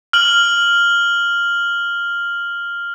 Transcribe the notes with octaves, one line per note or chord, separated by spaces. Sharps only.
F6 F#7